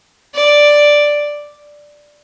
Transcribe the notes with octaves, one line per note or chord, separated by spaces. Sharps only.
D5